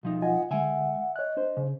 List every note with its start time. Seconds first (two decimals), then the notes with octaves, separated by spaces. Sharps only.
0.03 B1 F3 D#4
0.22 F4 D#5 F#5 G#5
0.51 D3 G#3 E5 F#5 G#5
1.16 C#5 D#5 F#6
1.37 D4 C5
1.57 C#3